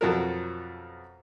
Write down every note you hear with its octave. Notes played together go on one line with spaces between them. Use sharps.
F2 B2 F#3 A4 A#4